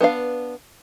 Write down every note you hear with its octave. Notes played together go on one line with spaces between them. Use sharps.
B3 D4 B4 F5